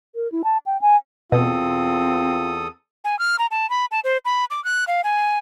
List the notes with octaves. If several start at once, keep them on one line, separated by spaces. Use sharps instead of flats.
A#4
E4
A5
G5
G#5
E2 B2 C4 F4 A4 D#6
G#5
F6
A#5
A5
B5
A5
C5
B5
D6
F#6
F5
G#5